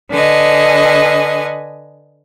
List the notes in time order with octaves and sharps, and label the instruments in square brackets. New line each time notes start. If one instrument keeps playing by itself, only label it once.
[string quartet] D3 B4 D#5 G#5